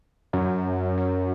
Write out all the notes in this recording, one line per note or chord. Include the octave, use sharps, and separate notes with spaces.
F#2
F#2